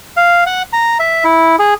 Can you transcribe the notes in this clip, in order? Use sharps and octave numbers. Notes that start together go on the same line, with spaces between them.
F5
F#5
A#5
E5
E4
G#4